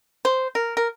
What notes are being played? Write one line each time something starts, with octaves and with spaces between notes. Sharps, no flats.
C5
A#4
A#4